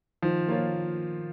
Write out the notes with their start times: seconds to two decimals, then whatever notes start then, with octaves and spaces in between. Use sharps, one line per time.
0.22 D#3 F3
0.47 A#3 F4 A#4 C#5